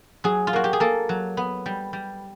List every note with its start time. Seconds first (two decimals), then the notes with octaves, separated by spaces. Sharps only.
0.24 F#3 G#4
0.47 F4
0.53 A#3 F#4
0.64 G4
0.73 G#4
0.80 A#3 A4
1.09 F#3
1.37 B3
1.66 G3
1.93 G3